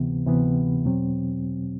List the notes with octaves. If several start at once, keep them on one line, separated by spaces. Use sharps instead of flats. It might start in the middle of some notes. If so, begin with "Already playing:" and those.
Already playing: D2 C3 E3 B3
D2 C3 E3 B3
E2 B2 F#3 C4